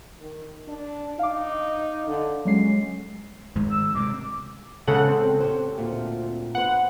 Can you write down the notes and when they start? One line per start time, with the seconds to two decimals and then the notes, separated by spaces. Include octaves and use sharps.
0.21 D#3
0.68 D4
1.19 D#4 F5 D6
2.07 D3
2.45 F#3 G#3 C#4 C7
3.56 G#2 D#3 G#3
3.71 E6
3.95 C3 G#3 D6
4.87 E2 C#3 G#3 A4 F#5
5.08 C4
5.41 C#4 G4 C5
5.78 D2 A#2
6.55 B3 C5 F#5